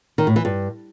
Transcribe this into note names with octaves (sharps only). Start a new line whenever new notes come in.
D#3
A2
E3
G2